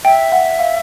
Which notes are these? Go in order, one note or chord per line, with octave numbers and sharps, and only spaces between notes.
E5 G5
F#5
F5